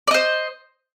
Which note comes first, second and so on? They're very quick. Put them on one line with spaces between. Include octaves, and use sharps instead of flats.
D5 D#5 C5